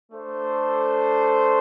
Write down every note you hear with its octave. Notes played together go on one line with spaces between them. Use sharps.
A3 D4 A4 C5